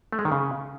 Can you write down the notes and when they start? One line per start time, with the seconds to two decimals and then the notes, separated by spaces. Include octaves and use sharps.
0.13 A3
0.19 G#3
0.25 D#3
0.32 C#3